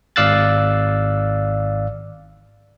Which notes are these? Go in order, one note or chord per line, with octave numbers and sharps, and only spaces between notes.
G#1 D5 F5 E6 F#6 A6